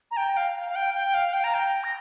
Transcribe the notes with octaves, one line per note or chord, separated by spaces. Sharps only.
A#5
G5
F5
F5
G5
G5
F5
G5
A#5
G5
A#6